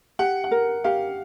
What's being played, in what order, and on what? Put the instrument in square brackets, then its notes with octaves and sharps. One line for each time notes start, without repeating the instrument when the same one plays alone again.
[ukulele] G4 [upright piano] F#5
[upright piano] F#5
[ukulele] A#4
[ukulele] G4 [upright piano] F5